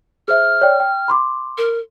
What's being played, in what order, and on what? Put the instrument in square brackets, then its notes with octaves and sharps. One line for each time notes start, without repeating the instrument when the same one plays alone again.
[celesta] G#4 C5 E5 [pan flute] F6
[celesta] C#5 D5 G5
G5
B5 C6 D6
[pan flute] A#4